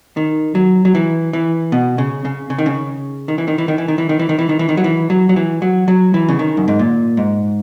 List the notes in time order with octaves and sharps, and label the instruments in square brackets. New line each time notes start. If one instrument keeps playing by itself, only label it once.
[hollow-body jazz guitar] D#3
F#3
F#3
E3
E3
B2
C#3
C#3
C#3
D#3
C#3
D#3
E3
D#3
E3
D#3
E3
D#3
E3
D#3
E3
D#3
E3
D#3
E3
D#3
F#3
E3
F#3
F#3
E3
F#3
F#3
E3
C#3
D#3
F#2
G#2
A#2
G#2